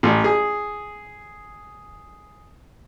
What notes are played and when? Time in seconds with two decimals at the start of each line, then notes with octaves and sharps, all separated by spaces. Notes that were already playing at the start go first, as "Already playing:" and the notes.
0.03 A1
0.24 G#4